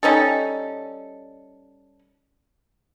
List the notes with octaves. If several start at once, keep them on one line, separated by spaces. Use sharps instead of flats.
G3 C#4 D#4 A4